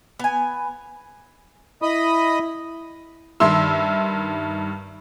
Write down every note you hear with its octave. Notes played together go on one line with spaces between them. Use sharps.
B3 G#5
E4 D#5 B5 D#6
G2 D#3 E5 C6 E6